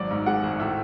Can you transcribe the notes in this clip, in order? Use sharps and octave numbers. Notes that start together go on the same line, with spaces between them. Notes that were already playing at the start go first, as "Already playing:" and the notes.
Already playing: G#1 F#3 D5
G#2
G#3 F#5
G#1
A2 E5